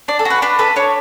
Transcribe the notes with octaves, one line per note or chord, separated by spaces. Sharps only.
D4 D5
A4
F#4 B4
D4 B4
A4 B4
D4 C#5